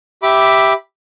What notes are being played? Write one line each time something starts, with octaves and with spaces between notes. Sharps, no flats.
G4 E5 B5 D6